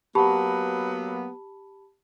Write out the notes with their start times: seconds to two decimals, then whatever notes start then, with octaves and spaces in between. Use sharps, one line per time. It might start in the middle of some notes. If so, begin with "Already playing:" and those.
0.15 F#3 A#3 B3 G4 A5 B5